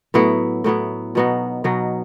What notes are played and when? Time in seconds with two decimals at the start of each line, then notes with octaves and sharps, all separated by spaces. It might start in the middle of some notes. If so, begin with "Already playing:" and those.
0.14 A2 F#3 B3 E4
0.64 A2 F#3 B3 E4
1.15 B2 F#3 B3 D#4
1.64 B2 F#3 B3 D#4